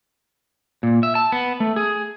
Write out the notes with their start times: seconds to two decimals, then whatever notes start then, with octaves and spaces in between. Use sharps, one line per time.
0.83 A#2
1.03 E5
1.15 A5
1.32 B3
1.60 A3
1.76 G#4